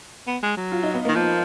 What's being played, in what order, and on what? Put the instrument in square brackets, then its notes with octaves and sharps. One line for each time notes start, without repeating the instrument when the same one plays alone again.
[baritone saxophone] B3
G#3
F#3
[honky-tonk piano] F4
D#4
B3
[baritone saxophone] D#3 [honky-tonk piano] A#3
[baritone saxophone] F3